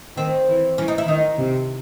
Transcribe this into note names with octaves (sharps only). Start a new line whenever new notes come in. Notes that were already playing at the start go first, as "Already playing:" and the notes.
D#3 C4
E3
E3 C#4
D#4
E4
D#3 D#4
C3